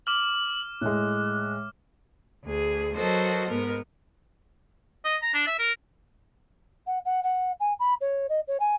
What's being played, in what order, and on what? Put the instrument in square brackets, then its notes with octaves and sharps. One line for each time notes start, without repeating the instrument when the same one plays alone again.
[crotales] D6 F6 [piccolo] F#7
[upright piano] A2 G#3 [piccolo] F#6
[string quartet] D2 G#4
F#3 F#4 A4 A#4 C5 D#5
G#2 B3 A#4
[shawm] D#5
A#5
D4
E5
A#4
[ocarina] F#5
F#5
F#5
G#5
B5
C#5
D#5
C#5
G#5